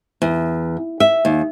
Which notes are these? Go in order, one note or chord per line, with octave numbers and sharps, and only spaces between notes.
E2
E5
D#2